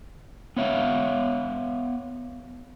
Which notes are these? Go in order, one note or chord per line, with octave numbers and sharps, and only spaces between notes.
B3 C#5 E5 F5